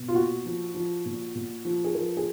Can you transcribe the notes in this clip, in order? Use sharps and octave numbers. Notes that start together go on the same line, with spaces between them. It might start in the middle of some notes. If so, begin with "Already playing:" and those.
Already playing: B2
F4
A#2 F#4
F3
F3
A#2
A#2
F3
G#4
F3 A#4
G#4